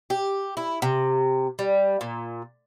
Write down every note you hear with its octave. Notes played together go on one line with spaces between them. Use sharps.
G4
E4
C3
G3
A#2